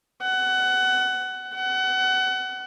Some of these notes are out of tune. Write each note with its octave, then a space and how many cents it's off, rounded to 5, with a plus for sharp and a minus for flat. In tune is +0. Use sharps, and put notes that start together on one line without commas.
F#5 +20
F#5 +25